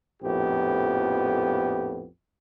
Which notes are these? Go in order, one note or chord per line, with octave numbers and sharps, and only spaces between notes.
A#1 F2 A2 B3 G4